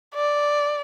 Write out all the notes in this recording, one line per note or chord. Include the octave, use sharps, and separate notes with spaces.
D5